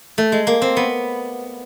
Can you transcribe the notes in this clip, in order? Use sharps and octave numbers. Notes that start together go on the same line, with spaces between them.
A3
G#3
A#3
C4
B3